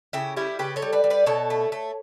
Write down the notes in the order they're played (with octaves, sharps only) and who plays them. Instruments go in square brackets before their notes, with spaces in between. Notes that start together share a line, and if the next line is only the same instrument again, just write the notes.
[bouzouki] C#3 E4 G4
G3 E4 G4
C#3 G4 B4
A4 C#5
G3
B4 D5
G3
B4 D5
B2 A4 C#5
A3
A3